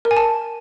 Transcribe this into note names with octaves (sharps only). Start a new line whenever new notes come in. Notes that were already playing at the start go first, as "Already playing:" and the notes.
A#4
G#5
A5